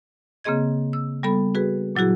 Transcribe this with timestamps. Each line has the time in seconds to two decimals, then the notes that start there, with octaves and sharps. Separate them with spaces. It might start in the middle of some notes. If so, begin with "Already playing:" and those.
0.44 C#3 A#3 C4 G#4 D#5 G#6
0.93 E6
1.23 G3 B3 A4 B5
1.55 F#4 G#4 B4
1.95 A#2 F#3 E4 F#4 G#4